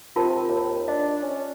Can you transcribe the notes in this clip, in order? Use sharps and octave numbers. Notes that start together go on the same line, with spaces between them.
C3 F4 A#4 A5
D#2
D4 D#5
C#4